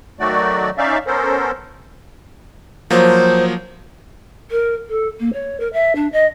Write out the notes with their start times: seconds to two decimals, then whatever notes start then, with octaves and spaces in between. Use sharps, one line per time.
0.20 D#3 F#3 A3 F#4 D5
0.78 C#4 D#4 D5 E5 F5
1.07 B3 C#4 A4 A#4 C5
2.90 F3 F#3 A#3 C5
4.51 A#4
4.89 A4
5.20 A#3
5.33 C#5
5.60 A#4
5.73 E5
5.95 D4
6.12 D#5